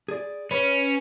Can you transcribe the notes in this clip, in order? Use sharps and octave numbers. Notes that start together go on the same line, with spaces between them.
G#4 D5
C#4 B4